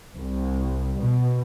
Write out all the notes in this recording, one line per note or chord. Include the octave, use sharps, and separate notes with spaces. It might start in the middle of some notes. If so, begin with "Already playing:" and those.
C2
B2